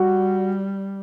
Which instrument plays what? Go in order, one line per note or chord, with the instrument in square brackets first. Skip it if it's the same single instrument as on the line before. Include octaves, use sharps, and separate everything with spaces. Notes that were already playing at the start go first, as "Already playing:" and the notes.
Already playing: [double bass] G3 [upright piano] F#4